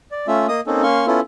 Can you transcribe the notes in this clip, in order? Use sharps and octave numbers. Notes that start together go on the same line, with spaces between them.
D5
A3 C#4 F4 E5
A#3 D#5 D#6
A#3 C4 C#4 D#4 A4
A#3 C#4 F5 C6 C#6
B3 C#4 E4 F4 A4